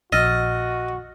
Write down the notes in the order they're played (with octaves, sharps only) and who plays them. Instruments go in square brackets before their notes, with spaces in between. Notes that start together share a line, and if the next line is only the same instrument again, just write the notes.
[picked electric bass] A#1 [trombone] F#4 [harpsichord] D#5 [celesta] E6 F6 A6